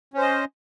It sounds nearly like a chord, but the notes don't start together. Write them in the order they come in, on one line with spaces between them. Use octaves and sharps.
C#4 C5 D#5